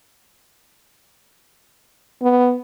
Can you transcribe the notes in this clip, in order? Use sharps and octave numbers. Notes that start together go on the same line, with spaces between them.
B3